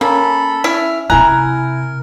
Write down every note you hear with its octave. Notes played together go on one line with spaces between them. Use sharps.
A#3 C#4 A4 B5
E4 E5 F6
C3 C4 E4 A#4 G#5 A#5 F#6